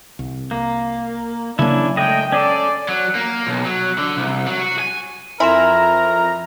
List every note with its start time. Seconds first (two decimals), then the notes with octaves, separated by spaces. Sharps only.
0.19 C2
0.51 A#3
1.59 C#3 F#3 A#3 C#4 D4 E4
1.97 G#3 A3 D#5 G5
2.32 C#4 G#4 A4 D5
2.88 F#3
3.15 A#3
3.47 B1
3.65 F#3
3.98 D3
4.17 C2
4.47 F#3
4.60 F#4
4.79 G#5
5.40 F2 E4 A#4 G#5 A#5 C6 E7